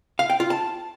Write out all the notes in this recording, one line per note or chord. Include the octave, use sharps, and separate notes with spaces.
F5
G5
F4
A5